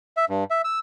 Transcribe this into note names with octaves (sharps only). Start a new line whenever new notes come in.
E5
G2
E5
E6